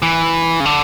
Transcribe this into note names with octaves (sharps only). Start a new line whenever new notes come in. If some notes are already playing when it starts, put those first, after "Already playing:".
E3
C#3
D3